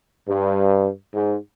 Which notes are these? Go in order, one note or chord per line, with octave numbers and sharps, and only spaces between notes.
G2
G#2